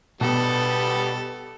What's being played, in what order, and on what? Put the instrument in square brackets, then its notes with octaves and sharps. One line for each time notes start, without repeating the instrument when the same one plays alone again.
[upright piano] B2 [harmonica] G3 B3 [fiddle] A4